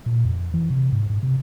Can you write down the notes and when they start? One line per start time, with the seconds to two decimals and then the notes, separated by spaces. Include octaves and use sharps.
0.06 A#2
0.25 F2
0.39 F2
0.54 E3
0.70 C3
0.92 G#2
1.10 G#2
1.23 C3